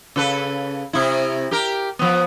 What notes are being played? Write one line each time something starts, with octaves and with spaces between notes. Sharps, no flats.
C#3 A4 B4
C3 E4
G4 A#4
F3 B3